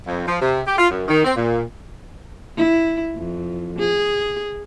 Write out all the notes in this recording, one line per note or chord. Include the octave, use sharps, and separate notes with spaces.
F2
F3
C3
G4
F4
F#2
D#3
C4
A#2
E4
F2
G#4